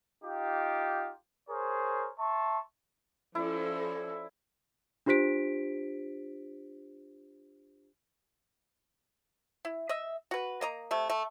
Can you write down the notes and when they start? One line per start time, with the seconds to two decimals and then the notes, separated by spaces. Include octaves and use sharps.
0.23 D#4 F4 G4
1.49 G#4 A#4 C5 C#5
2.19 E5 A5 C6 C#6
3.35 F3 C#4 E4 A4 D5
5.06 D4 F4 G4 C5 B6 D7
9.65 E4
9.89 D#5 E5
10.31 F#4 B4
10.61 A#3 D#5 A#5
10.91 C3 A3
11.10 A3